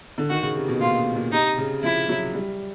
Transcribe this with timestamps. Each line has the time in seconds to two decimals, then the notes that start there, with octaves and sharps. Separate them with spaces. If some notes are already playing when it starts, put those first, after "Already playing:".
0.18 D3
0.30 D#3 F#4
0.43 C#3
0.56 C3
0.68 B2
0.81 A#2 F4
1.15 A#2
1.32 C3 D#4
1.58 C#3
1.83 F3 E4
2.09 F#3
2.34 G3